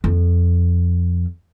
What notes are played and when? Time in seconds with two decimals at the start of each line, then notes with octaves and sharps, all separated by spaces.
0.04 F2